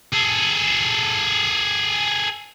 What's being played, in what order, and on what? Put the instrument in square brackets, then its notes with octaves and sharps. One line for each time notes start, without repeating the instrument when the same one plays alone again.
[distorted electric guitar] G#4 A4